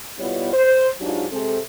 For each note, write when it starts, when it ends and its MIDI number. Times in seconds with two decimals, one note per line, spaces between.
0.19 0.51 47
0.19 0.51 55
0.19 0.51 59
0.19 0.51 64
0.19 0.51 65
0.19 0.51 73
0.53 0.88 72
1.00 1.25 44
1.00 1.25 54
1.00 1.25 62
1.00 1.25 63
1.00 1.25 65
1.00 1.25 67
1.31 1.58 48
1.31 1.58 56
1.31 1.58 60
1.31 1.58 69